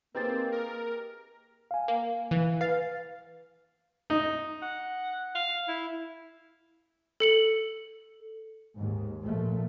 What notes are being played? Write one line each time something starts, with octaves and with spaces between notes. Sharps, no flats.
A#3 C4 D#4 G4 G#4 B4 A6
A#4
F5 G#5
A#3
E3
B4 F5 A6
D#4
F#5
F5
E4
A4 C#7 F#7
D#2 G#2
A#2 F3 A3